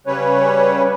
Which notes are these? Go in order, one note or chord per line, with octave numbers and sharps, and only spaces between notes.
C#3 G3 C#4 B4 C#5